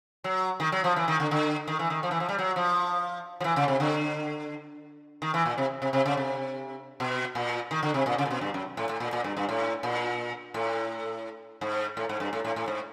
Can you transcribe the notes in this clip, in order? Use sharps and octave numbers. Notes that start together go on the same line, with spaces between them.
F#3
D#3
F#3
F3
E3
D#3
D3
D3
D#3
E3
D#3
F3
E3
F3
G3
F#3
F3
F3
E3
C#3
C3
D3
D#3
E3
A#2
C3
C3
C3
C#3
C3
B2
A#2
D#3
D3
C3
A#2
C#3
A#2
B2
G2
F#2
A2
A2
A#2
A#2
G2
G2
A2
A#2
A2
G#2
A2
G#2
G2
A2
A2
A2
G#2